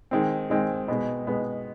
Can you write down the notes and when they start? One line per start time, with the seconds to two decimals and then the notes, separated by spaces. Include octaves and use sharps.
0.11 D#3 G#3 C4
0.50 D#3 G#3 C4
0.88 B2 G#3 B3
1.27 B2 G#3 B3